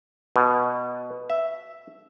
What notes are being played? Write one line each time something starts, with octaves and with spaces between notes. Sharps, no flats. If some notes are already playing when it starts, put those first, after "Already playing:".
B2
E5